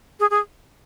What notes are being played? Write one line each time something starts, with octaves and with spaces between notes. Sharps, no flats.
G#4
G#4